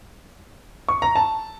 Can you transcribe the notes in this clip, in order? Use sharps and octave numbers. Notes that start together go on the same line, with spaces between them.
C#6
A#5
A5